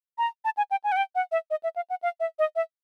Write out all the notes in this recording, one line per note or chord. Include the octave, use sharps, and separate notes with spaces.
A#5
A5
G#5
G5
G#5
F#5
G5
F#5
E5
D#5
E5
F5
F#5
F5
E5
D#5
E5